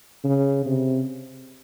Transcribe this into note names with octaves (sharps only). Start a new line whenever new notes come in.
C#3
C3